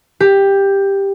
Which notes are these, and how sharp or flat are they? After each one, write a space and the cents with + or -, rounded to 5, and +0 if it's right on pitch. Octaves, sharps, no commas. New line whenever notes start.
G4 +10